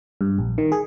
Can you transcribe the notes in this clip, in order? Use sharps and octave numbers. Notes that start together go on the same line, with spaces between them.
G2
A#1
D#3
G#4